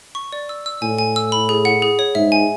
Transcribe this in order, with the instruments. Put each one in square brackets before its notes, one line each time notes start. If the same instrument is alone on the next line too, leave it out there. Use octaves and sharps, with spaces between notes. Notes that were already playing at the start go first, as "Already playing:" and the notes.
[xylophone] C#6
D5
E6
E6
[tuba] A2 [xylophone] G#5
[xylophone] G#5
E6
B5
G#4
F#5
G#4
C#5
[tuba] G#2 [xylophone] E5
[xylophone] G#5